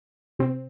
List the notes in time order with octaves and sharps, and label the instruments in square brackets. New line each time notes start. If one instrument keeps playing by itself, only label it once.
[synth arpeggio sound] C3 C4